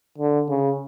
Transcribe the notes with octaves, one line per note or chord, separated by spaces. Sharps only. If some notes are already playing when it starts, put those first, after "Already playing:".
D3
C#3